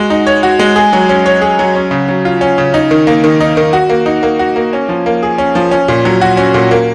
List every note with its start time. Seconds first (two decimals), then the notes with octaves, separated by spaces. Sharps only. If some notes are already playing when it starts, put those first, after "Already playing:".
Already playing: G#3 F#4
0.10 D#4
0.27 C#5
0.43 F#4
0.59 G#3
0.76 G#4
0.93 F#3
1.09 C#4
1.26 C#5
1.42 G#4
1.59 F#3
1.75 C#4
1.91 C#3
2.08 F#3
2.25 F4
2.41 C#4
2.58 C#3
2.74 D#4
2.91 D#3
3.07 A#3
3.24 D#3
3.40 D#4
3.57 D#3
3.73 F#4
3.89 A#3
4.06 D#4
4.23 A#3
4.39 F#4
4.56 A#3
4.73 C#4
4.89 F3
5.06 A#3
5.23 G#4
5.38 C#4
5.55 F3
5.71 C#4
5.88 A#2
6.05 F#3
6.21 F#4
6.37 C#4
6.54 A#2
6.71 A#3